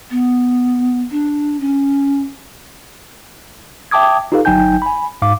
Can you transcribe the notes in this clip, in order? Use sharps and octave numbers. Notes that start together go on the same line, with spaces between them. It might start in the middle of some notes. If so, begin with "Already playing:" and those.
B3
D4
C#4
E5 G5 A5 D6 D#6 G#6
D#4 F4 G4 A4 B4 F5
G1 F#3 D#4 G5 G#5 G6
G#5 B5
G#2 F5 D6